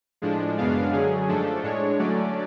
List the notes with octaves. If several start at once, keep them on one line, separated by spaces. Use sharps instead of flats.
A2 F3 G#3 D4
F#2 C#3 G#3 B3 D4 F5
F#2 D3 F#3 C#4 G#4
G#2 F3 A3 D4 A4
A2 G#3 D4 C#5
D3 F#3 A3 C#4 D5